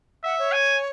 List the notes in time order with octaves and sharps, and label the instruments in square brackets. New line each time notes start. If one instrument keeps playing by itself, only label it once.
[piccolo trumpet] E5 [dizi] F#5
[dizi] C#5
[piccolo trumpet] G#5